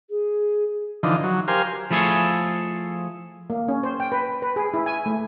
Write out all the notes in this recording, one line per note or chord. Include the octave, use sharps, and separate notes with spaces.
G#4
D3 E3 F3 D#4
F#3
G4 A#4 C5 F5 G#5
F3 A3 E4 G#4 A4 C#5
A#3
C#4
C5
G5
B4
B4
G#4
E4
G#5
A3